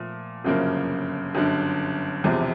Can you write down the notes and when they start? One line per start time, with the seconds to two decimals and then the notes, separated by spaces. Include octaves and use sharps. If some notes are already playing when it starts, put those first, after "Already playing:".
Already playing: A#2 F3 A3
0.44 G1 F#2 C#3 F3 A#3
1.35 G1 F#2 D3
2.24 E1 E2 C3 F3